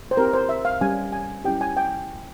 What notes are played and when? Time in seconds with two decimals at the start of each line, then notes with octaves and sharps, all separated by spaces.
0.11 C5
0.17 C4 E4 G4 A#4
0.33 C5
0.49 E5
0.65 F5
0.81 G3 C#4 G4 G#5
1.13 G#5
1.45 G3 C#4 E4 G4 G5
1.61 G#5
1.77 G5